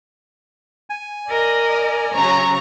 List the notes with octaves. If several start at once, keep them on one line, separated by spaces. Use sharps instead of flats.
G#5
A#4 D5 D#5
C#3 F#3 C#5 A#5